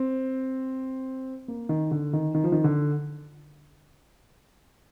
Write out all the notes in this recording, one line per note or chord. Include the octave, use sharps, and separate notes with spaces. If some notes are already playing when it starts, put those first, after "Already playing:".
Already playing: C4
A#3
D#3
D3
D#3
D#3
F3
D#3
D3